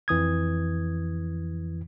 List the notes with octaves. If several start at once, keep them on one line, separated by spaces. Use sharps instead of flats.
F2 E3 D#6 G#6